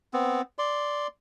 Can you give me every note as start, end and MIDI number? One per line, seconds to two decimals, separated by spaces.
0.13 0.42 59
0.13 0.42 60
0.59 1.07 74
0.59 1.07 84